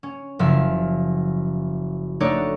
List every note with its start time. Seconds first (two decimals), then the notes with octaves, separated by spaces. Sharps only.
0.03 C#4
0.39 F#1 F3 E5 F5
2.20 A3 D4 D#4 F#4 C#5 D5